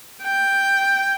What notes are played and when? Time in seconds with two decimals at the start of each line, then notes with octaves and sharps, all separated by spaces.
0.23 G5